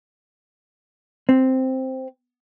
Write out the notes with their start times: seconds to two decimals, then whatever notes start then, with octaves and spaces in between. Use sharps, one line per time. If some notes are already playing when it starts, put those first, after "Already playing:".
1.29 C4